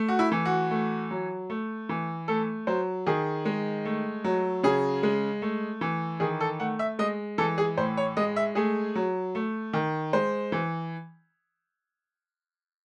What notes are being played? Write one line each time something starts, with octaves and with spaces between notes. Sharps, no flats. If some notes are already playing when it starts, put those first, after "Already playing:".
Already playing: A3
F#4
E4
E3
F#4
A3
F#3
A3
E3
A3 A4
F#3 C5
D#3 G#4
G#3
A3
F#3
C#3 G#4
G#3
A3
E3
D#3 G#4
A4
A3 F#5
E5
G#3 D#5
E3 A4
G#4
A2 C5
C#5
G#3 D#5
E5
A3 G#4
F#3
A3
D#3
G#3 C5
E3